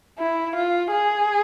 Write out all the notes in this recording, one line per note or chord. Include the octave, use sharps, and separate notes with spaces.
E4
F4
G#4